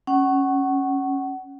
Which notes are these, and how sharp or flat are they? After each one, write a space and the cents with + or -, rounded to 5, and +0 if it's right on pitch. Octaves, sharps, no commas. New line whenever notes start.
C#4 -10 F#5 +25